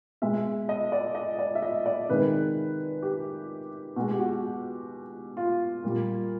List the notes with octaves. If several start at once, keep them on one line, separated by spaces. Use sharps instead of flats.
B2 G#3 E5
D#5
D5
D#5
D5
E5
D#5
D5
C3 D#3 G#3 B4
G4
B2 G#3 F#4
G4
F#4
F4
A#2 G3